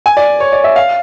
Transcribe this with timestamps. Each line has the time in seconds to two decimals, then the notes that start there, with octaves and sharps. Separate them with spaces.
0.06 G#5
0.17 D5
0.40 C#5
0.53 D5
0.64 E5
0.76 F5